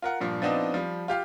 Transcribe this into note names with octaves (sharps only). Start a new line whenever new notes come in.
F4 A#4 F#5
G2 A#2 F3
F3 B3 C4 D4 D#4 D#5
F3 G3
F4 G4 F5